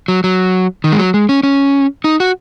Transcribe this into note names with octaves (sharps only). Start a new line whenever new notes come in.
F#3
F#3
D#3
G#3
F#3
G#3
C#4
C#4
D#4
F#4